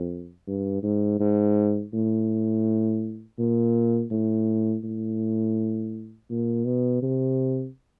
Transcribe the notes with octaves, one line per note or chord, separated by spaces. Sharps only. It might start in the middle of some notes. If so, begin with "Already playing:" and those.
Already playing: F2
G2
G#2
G#2
A2
A#2
A2
A2
A#2
B2
C3